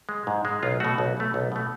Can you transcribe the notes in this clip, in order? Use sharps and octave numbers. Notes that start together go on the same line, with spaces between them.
G#3
G#2
G#3
B1 F4
B2 A3 F#4
B1
B2 A3
B1
B2 A3